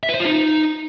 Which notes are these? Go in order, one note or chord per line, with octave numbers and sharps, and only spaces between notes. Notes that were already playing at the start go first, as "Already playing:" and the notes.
E5
B4
C5
F4
D#4